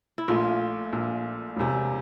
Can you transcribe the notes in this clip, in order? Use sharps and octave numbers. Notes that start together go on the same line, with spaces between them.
E4
A#1 A#2 A3 F4
A#1 A#2 A3
E1 E2 C3